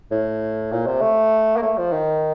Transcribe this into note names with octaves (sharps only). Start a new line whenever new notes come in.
A2
A#2
C3
A3
A#3
A3
F3
D#3